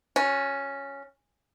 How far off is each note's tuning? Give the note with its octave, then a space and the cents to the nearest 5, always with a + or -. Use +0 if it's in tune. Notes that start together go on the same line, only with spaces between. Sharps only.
C#4 +0 F#4 -40